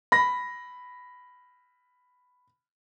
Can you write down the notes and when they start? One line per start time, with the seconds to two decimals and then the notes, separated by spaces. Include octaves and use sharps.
0.12 B5 A#6